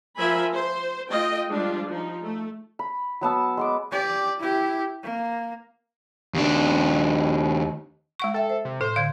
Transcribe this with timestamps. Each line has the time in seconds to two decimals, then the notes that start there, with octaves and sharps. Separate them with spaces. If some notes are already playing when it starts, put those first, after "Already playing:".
0.18 F3 A#4 C5 E5 G#5 B5
0.53 C5
1.10 A3 F4 D#5 G5
1.49 F3 G3 G#3 D4 F4
1.87 F3 D#4
2.22 A3
2.79 B5
3.21 F#3 B3 A5 E6
3.57 G#3 B3 D6
3.91 G4 D5
4.39 E4 G4
5.03 A#3
6.34 D#2 D4
8.20 G#3 F#5 C#6
8.34 A4 E5 G5
8.50 C5
8.65 C3
8.81 A2 A4 C5
8.96 D3 F5 G#6